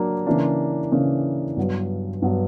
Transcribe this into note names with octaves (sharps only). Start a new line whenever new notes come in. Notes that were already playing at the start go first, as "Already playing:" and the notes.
Already playing: F#3 A#3 D4
C#3 E3 A#3 D4
C#3 E3 A#3 D4
G2 F#3 B3
G2 F#3 B3